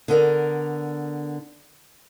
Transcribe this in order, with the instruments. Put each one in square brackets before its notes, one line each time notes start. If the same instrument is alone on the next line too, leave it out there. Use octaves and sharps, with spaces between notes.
[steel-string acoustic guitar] D3 B3 A#4 D5